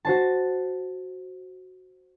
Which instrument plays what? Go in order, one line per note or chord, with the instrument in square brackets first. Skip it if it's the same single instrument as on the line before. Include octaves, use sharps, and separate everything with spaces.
[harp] F#4 C5 A5